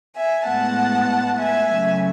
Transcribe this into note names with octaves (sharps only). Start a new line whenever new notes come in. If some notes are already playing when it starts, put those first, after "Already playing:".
E5 G#5
A2 G#3 B3 F#5 A5
E5 G#5
C#3 F#3 A3